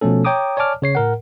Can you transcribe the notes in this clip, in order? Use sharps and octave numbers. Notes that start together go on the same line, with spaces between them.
B2 F3 A3 C#4 A4
C#5 G5 A#5 D6 D#6
C#5 D5 G#5 A5 D6 F6
C#3 C#5 C7
A2 A#4 F#5